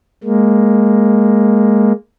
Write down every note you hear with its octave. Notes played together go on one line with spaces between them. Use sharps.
G#3 A#3